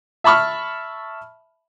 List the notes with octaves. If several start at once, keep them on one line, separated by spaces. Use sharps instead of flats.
E5 A5 B5 C#6 F6